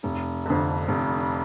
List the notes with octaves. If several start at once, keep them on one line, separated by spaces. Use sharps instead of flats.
F1
F2 D3
F1